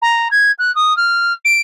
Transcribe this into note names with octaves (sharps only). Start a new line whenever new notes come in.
A#5
G#6
F#6
D#6
F6
D7